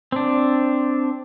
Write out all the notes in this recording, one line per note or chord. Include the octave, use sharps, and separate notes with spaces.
C4 D4